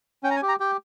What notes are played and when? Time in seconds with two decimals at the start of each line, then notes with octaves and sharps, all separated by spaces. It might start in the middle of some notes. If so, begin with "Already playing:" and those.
0.23 C#4 G5
0.31 A#5
0.36 G#5
0.42 G4
0.48 A#5
0.60 G4 G5